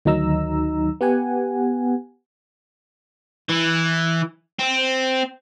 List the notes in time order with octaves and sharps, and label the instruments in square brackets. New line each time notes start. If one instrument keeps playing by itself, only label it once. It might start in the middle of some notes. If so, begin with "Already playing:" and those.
[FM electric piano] D2 D#3 F#3 D#4 A#5 E6
B3 G4 F#5 G#5
[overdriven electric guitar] E3
C4